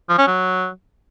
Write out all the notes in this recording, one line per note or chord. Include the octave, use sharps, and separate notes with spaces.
F3
C#4
F#3